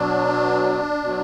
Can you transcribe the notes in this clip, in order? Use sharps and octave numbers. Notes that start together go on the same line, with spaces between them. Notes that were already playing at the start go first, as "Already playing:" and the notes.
Already playing: B2 F#3 D4
B2 F#3